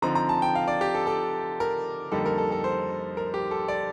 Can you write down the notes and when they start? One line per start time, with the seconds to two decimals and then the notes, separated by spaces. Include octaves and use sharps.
0.02 D3 F3 C4 D#4 A#5
0.15 A#5
0.29 A5
0.42 G5
0.55 F5
0.68 D5
0.81 G4
0.95 A4
1.07 A4
1.60 A#4
2.12 F2 D3 G3 A#3 D#4 A4
2.25 A#4
2.38 A4
2.52 A4
2.64 C5
3.17 A#4
3.34 G4
3.51 A4
3.68 D5